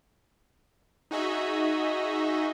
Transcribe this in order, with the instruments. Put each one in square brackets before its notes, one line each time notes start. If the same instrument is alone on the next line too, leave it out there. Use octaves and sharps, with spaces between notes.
[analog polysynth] D#4 F#4 G#4 D#5 E5